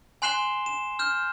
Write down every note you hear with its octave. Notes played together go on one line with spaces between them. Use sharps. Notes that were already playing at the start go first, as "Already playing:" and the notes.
G#5 C6 F#6 C7 E7 G7
E7
F6 G6 E7